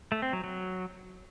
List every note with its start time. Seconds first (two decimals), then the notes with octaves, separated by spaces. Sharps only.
0.12 A3
0.22 C4
0.33 F#3
0.44 F#3